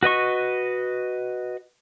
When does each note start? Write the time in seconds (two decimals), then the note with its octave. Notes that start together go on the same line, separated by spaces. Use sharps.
0.03 F#4 B4 D#5 C#6